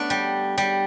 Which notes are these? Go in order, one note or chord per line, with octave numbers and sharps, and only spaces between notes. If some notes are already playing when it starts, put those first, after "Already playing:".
Already playing: A3 B3 D4
G3
G3